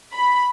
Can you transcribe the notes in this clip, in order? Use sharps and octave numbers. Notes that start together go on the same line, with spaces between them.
B5